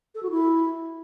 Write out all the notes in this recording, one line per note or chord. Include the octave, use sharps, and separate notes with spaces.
A4
F#4
E4